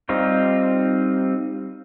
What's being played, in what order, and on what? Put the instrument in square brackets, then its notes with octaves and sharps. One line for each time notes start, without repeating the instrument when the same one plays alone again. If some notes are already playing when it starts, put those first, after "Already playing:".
[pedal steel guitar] G3 C4 D#4 F4